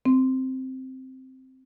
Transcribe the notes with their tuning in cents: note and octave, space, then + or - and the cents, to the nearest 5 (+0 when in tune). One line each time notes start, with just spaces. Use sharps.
C4 +0